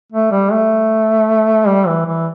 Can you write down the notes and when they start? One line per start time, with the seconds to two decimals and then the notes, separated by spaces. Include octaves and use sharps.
0.12 A3
0.32 G3
0.52 A3
1.68 G3
1.87 E3
2.06 E3